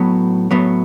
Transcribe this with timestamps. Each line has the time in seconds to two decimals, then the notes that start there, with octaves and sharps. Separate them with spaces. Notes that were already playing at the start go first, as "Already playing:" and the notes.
Already playing: A2 F#3 B3
0.51 A2 F#3 B3